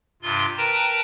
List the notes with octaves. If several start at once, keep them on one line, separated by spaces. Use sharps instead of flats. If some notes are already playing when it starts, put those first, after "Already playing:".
G2 C3 F4 C6
A#4 B4 G5 A5 A#5